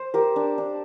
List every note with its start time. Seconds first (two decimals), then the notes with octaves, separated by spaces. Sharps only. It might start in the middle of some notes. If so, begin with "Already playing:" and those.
Already playing: C5
0.14 G4 A#4
0.36 D4
0.58 D4